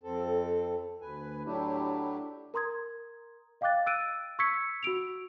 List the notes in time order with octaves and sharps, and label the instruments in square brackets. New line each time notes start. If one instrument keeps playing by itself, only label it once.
[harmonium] F2 C4 A4
D2 B4 G#5
A2 F#3 A3 D4 E4 G4
[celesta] A#4 A#5 C6 D#6 G#6
D#5 F5 G5 D6 F#6 A6
E6 F#6 A6 D7 D#7
C#6 E6 G#6 B6 C#7
F#4 E6 D7 F7